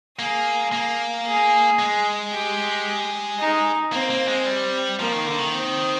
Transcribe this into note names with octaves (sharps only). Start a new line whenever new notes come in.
A#3 G#4
A#3
G#4
G#3
G4
D#4
A#3 C4
A#3
G#3
G3
F3 A#3
D#3
D3
D#3
C4